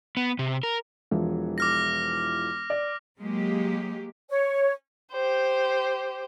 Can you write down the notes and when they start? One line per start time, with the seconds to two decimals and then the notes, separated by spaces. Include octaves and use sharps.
0.17 B3
0.39 C3
0.63 A#4
1.11 E1 E3 F3
1.58 D6 F6 A#6
2.70 D5
3.19 F#3 G#3 A#3 G4
4.30 C#5
5.12 G4 C5